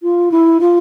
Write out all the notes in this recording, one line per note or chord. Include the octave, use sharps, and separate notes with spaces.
F4
E4
F4